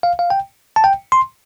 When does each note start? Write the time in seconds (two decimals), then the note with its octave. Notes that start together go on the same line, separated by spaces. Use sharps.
0.03 F5
0.19 F5
0.30 G5
0.76 A5
0.84 G5
1.12 C6